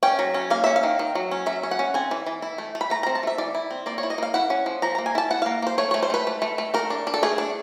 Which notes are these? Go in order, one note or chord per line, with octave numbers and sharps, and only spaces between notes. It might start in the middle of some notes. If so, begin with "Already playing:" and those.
C#4 G5
F#3
C#4
A#3 F5
C#4 E5
F5
D#3
D#3
F#3
C#4
F#3 E5
C#4
F#5
C#4
C4 G#5
E3
E3
E4
A3
A3
B5
A3 A#5
C4 A#5
A5
A3 E5
E3 D5
E4
C4
A#3 D5
C#5
E4
D#5
A#3 F5
E4 F#5
C#4
F3
F3 A#5
A#3 A#5
G#5
E4 A5
E4 F#5
A#3 F5
A#3 C5
A3 C#5
A3 C#5
C5
A3 B4
A3
A3
A3
A3 A#4
D4
D4
A4
A3 G#4
D4